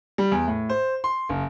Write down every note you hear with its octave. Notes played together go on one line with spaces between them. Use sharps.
G3
E2
A2
C5
C6
F#1